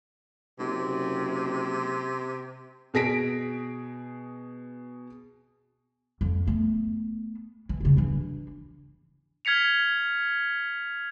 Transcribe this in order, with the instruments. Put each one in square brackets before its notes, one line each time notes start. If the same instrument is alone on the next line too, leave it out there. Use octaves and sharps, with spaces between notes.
[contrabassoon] F#1 [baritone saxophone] C3
[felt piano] B2 G#4 A#6 B6 D7
[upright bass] F2
A3 B3
E3
E1 C#3
E3 D4
[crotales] F6 G#6 B6 C#7 F7